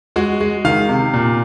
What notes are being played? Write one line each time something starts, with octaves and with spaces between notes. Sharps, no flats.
G#3 F#4
G#3
D#3 F5
C3
A#2